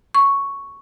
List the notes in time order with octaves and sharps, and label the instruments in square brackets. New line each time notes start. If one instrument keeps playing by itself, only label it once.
[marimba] C#6